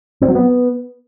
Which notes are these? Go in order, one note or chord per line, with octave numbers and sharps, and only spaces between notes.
C4
F#3
B3